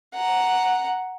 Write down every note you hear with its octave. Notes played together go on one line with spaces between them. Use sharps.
F#5 A#5